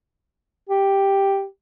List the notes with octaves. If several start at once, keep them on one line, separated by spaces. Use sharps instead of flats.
G4